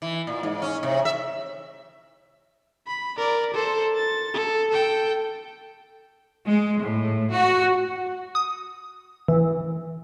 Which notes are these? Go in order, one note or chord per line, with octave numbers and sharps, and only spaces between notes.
E3
A#2
G#2
C#4
C3
E5
B5
A#4 D5
A4 C5
A6
A4
A4 G5
G#3
A2
F#4
D#6
E3